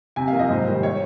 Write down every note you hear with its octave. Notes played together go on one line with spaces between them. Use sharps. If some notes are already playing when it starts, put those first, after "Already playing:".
C3 G#5
F5
F3 A#3
D#5
G#2 C5
D#3 G3
C#5